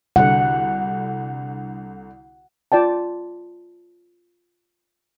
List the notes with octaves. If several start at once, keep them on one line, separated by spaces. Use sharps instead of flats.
C2 D3 F#5
F4 D5 G5 A5